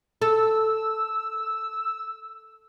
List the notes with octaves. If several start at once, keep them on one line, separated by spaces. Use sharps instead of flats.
A4 E6